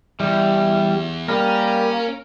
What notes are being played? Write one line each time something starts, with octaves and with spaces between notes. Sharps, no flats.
E2 G3 E4
G3 A#3 C#4 A#4